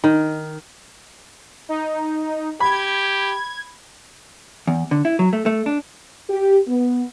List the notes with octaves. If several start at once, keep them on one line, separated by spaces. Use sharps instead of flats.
D#3
D#4
G4 B5 G#6
E2
D3
E4
F#3
A3
A3
D4
G4
B3